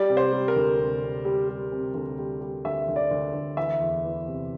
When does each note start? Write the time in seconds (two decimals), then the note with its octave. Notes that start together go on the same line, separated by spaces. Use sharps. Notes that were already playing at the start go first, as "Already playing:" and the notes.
Already playing: G3 D5
0.10 C3
0.17 C5
0.32 G3
0.48 A#4
0.56 D2
0.79 C3
1.02 C3
1.25 G3
1.49 G3
1.72 C3
1.94 D2
2.19 G3
2.41 G3
2.65 D2 E5
2.88 D2
2.96 D5
3.11 D2
3.33 D2
3.57 E3 E5
3.80 E2
4.04 E3
4.27 C3